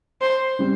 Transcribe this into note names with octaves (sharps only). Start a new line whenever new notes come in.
C5
C#3 G3 C4